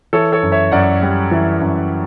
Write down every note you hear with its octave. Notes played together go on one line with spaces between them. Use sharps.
E3 A4 C#5
A4 C#5
F#2
C#5 E5
F#2 D5 F#5
G3
E3
F#2